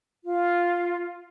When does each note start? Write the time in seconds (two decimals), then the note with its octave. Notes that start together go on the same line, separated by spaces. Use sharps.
0.24 F4